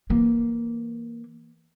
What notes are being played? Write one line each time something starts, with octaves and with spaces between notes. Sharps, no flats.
E3 A#3